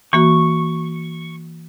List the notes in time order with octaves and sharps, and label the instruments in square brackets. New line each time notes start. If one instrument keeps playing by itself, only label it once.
[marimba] E3 A#3 F#4 [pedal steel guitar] C#6